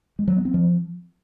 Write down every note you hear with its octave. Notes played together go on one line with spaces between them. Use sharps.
G#3
F#3
B3
C4
F3